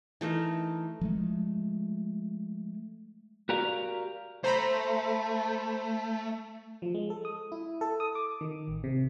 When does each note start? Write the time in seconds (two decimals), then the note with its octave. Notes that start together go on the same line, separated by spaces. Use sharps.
0.21 E3 A3 D#4 A#4
1.01 F3 G#3 A3
3.49 F#4 G4 A#4 D5 F5
4.44 A3 C5 A#5 B5
6.82 F3
6.94 G#3
7.10 A4
7.25 D#6
7.52 E4
7.81 A4
8.00 D#6
8.15 D6
8.41 D#3
8.68 A1
8.84 C3